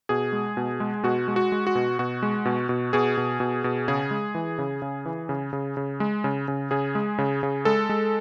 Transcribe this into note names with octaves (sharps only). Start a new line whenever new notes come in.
B2 G#4
G#3
B2
G#3
B2 F#4
G#3
F#4
G#3
F#4
B2
B2 F#4
G#3
B2
B2
B2 G#4
B2
B2
B2
C#3 G#4
G#3
E3
C#3
C#3
E3
C#3
C#3
C#3
G#3
C#3
C#3
C#3 G#4
G#3
C#3
C#3
G#3 A4
G#3